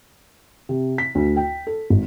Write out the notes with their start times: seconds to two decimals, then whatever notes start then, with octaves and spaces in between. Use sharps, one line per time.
0.69 C3
0.98 B6
1.15 D2
1.36 G5
1.67 A4
1.90 G#1